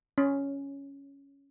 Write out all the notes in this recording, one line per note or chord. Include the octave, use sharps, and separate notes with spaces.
C#4